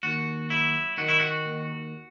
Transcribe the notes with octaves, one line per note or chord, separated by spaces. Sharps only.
D#2 F#4
F#3 E4
D#3 F#4
E4
F#4
D#2